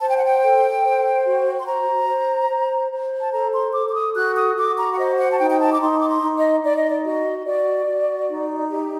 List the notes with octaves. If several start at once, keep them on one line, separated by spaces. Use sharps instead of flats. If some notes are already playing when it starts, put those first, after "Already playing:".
C5 A5
G5
F#5
G5
A4
C5
F#4
C6
C5 A#5
C5
C5
C5
A5
A4 A#5
C6
A4 D6
D6
D#6
F#4 F#6
D#6
F#4 D6
A#5
F#5
C5 D#5
F#5
A5
D#4 G5
G5
A5
D6
D#4 C6
D6
C6
D#4
D#5
D#4 D5
D#5
D5
F#4 D#5
F#4 D5
F#4
D#4
G4